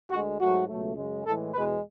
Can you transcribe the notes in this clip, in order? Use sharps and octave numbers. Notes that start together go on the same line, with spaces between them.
D2 D3 G#3 F#4
G#2 F#3 A3 F#4
C#2 B2 F#3 A3
F#2 C#3 G#3
A2 E3 G#3 A4
E2 B2 G#3 B4